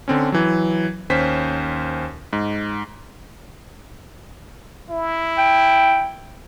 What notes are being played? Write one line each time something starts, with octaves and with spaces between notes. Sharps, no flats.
D3 C4 C#4
E3 F#3
D#2 C#4 C5 B6
G#2
E4
G5